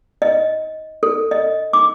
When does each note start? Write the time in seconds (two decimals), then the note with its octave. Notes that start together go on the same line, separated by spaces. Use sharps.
0.22 D#5
1.03 A4
1.31 D#5
1.73 D6